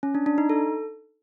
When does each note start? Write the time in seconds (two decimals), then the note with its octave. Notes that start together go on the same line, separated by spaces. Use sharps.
0.03 C#4
0.15 D4
0.26 D4
0.38 D#4
0.50 A4